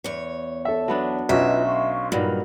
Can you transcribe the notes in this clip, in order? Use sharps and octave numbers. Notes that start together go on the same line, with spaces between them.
E2 C#5
A4 E5 A5
F#3 B3 D4
B1 C#4 F4 F#4 B4 D#5 E5
F5 C6 C#6
G2 A#2 F#3 D#4 A#4 B5